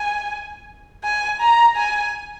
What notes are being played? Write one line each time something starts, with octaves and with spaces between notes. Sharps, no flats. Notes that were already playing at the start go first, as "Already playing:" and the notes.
Already playing: G#5
G#5
A#5
G#5